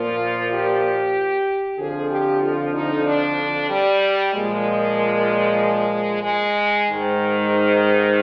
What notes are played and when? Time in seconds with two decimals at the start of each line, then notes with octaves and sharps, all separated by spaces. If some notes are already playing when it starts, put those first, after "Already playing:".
Already playing: A#2 F3 F4
0.51 G4
1.78 F2 D3 F3 G#4
2.10 G4
2.42 F4
2.73 D#4
3.06 D4
3.69 G3
4.33 A#2 F3 G#3
6.23 G#3
6.87 G#2 D#3
7.50 D#4